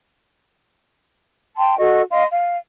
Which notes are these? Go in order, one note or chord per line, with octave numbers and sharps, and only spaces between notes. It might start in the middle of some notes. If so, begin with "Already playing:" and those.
G5 A5 C6
F#4 A4 D#5 C#6
D#5 F5 C6
F5